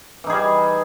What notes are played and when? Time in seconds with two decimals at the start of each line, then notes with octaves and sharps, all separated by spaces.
0.24 E3
0.27 D#4
0.30 G#4
0.32 G3